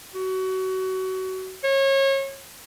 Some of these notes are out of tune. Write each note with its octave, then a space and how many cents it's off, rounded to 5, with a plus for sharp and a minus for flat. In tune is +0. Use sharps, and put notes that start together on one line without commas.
F#4 +25
C#5 -30